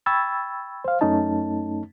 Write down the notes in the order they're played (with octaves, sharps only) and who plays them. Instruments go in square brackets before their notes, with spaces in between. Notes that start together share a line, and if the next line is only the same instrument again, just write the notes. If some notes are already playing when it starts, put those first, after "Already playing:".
[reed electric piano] G5 B5 C#6 E6 G#6 A6
C5 F5
F#2 A3 C#4 D#4 A5